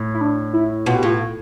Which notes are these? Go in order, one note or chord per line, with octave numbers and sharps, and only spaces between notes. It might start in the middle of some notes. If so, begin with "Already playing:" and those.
Already playing: A2
E4
D4
E4
B2 F4
G4
A2 F4